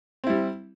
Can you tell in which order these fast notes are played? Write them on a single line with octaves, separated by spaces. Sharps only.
C4 E4 G3